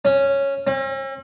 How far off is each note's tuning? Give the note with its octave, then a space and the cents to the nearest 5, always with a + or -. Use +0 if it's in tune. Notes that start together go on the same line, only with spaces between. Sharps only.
C#4 -5
C#4 -45